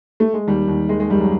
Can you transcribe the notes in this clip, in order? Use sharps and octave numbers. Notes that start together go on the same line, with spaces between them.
A3
G#3
D#2 G3
D#2
D#3 G#3
G#3
F#2 G3
F#3